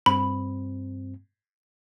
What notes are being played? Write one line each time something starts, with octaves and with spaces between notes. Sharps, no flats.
G2 C4 B5